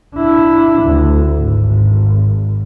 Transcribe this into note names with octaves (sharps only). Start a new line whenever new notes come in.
D4 E4
D2
G#1